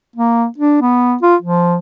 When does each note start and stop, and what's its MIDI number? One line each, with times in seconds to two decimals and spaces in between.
0.16 0.46 58
0.58 0.79 62
0.81 1.15 59
1.22 1.36 65
1.42 1.76 53